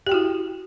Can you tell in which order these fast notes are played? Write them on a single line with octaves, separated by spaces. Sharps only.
G4 G5 F#4 E4